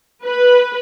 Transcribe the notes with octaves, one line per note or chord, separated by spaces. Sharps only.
B4